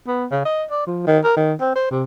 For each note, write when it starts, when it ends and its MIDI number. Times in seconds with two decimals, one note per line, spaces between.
0.07 0.26 59
0.31 0.41 49
0.45 0.64 75
0.70 0.86 74
0.87 1.04 53
1.07 1.19 51
1.24 1.35 70
1.37 1.53 51
1.61 1.72 60
1.76 1.87 72
1.91 2.04 48